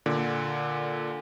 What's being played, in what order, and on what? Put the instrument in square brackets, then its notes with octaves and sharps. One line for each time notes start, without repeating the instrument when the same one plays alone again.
[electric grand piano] A#2 D3